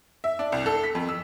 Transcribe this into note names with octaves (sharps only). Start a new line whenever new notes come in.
E5
D4
C2
A4
B6
F2
E6